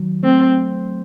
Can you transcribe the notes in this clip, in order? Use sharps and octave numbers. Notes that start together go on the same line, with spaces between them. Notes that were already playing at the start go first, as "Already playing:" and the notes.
Already playing: D#3 F#3
A3 C4